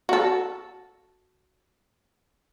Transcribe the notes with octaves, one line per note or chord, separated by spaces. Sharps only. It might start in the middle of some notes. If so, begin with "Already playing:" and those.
F#4 A4